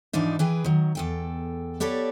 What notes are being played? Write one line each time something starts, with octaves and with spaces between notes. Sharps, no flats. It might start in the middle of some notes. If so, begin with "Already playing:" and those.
G#2 E3 F3 D4 D#4
E3 G#4 B4 G5
D#3 F#3
E2 A4 G5
B3 G4 A4 C#5 D5